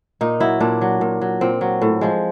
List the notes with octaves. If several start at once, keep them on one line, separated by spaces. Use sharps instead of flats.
A#2 D#4
F#3 E4
A#2 D4
F#3
A#2
F#3
A#2 C4
F#3
A2
F3 G#3